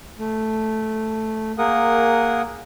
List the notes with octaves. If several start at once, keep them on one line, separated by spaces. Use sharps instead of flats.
A3
A#3 G#4 A#4 F#5 D#6